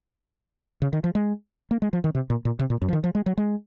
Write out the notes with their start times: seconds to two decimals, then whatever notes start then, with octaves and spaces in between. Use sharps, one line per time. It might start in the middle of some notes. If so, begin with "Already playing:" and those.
0.82 C#3
0.93 D#3
1.04 F3
1.15 G#3
1.71 A#3
1.82 G#3
1.93 F3
2.04 D#3
2.15 C3
2.30 A#2
2.45 A#2
2.59 C3
2.70 A#2
2.82 F#2
2.88 F3
2.93 D#3
3.04 F3
3.15 G#3
3.26 F#3
3.37 G#3